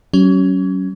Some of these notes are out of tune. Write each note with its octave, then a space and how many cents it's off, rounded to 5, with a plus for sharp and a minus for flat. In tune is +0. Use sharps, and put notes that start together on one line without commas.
F#3 +35 C#4 +5